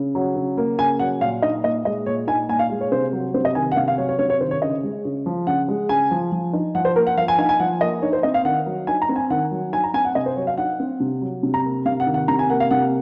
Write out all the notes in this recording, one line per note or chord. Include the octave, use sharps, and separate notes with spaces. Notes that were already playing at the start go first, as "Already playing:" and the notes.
Already playing: C#3
F#3
C#3
A#3
C#3 G#5
F#3 F#5
A#2 F5
D#4 D#5
A#2 D#5
G#3 D#5
A#2 C#5
D#4 G#5
A#2 G#5
F5
G#3
C#5
C3 C5
F#3
C3 C5
D#5
D#3 G#5
F#5
C3 F5
F5
F#3 C#5
C#5
C3 C#5
C#5
D#3 C5
C#5
C#3 D#5
G#3
C#3
F3
C#3 F#5
G#3
C#3 G#5
F3
F3
D#4
F3 F#5
C5
A#3 A#4
F#5
F3 F5
G#5
D#4 G#5
G#5
F3 F#5
A#3 D#5
D#4 C#5
C5
C4 D#5
F5
D#3 F#5
F#3
D#4 G#5
A#5
C4
G#5
D#3 F#5
F#3
D#4 G#5
A#5
C4 G#5
F#5
C3 D#5
C5
F#3 C#5
F5
D#4 F#5
C4
C3
F#3
C3
A#5
A#3
C3 F5
F#5
D#3
F#5
C3 A#5
G#5
A#3 F#5
F5
C3 F#5